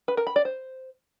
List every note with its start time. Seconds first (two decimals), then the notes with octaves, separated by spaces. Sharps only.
0.08 B4
0.17 A#4
0.27 B5
0.36 D5
0.45 C5